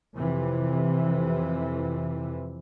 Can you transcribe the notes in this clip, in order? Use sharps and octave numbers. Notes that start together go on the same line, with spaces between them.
F2 C3 E3